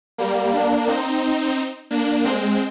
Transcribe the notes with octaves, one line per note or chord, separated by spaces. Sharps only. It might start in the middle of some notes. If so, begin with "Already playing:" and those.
G3 A#3
A#3 D4
C4 D#4
A#3 D4
G#3 C4